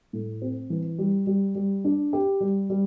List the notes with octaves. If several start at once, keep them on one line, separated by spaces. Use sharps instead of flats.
A2
C4
E3
G3
G3
G3
D4
G4
G3
G3